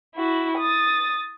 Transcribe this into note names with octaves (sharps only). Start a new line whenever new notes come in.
E4 F#4
D#6 A6